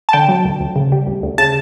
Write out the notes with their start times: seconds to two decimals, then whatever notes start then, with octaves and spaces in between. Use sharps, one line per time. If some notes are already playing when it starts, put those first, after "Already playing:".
0.09 A5
0.13 D3 G5
0.29 F#3
0.45 D2
0.60 D2
0.76 C#3
0.92 G3
1.07 D2
1.23 D2
1.38 C#3 A5